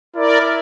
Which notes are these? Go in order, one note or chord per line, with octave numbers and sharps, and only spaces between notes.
E4 A#4 D5